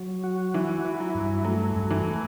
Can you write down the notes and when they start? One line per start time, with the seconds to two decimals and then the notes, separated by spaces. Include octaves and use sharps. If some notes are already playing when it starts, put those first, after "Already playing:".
Already playing: F#3
0.24 F#4
0.54 E3 E4
0.85 E4
1.00 F#3
1.15 G2
1.45 F#3 A3
1.76 G2
1.91 E3